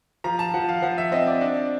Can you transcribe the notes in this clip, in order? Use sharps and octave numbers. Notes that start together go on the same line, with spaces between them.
F3 A#5
A5
F3 F#5
F5
F3 F#5
E5
C4 D#5
D5
D4